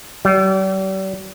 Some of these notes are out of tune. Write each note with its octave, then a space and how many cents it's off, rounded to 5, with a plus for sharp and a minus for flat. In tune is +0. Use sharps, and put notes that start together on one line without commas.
G3 -45